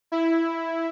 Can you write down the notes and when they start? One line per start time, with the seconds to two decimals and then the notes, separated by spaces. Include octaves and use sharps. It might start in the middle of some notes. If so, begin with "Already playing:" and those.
0.12 E4